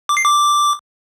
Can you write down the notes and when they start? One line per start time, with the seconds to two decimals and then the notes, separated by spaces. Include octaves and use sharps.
0.09 D6
0.17 C7
0.24 D6